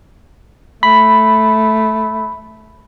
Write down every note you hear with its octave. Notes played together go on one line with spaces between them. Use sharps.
A3 B5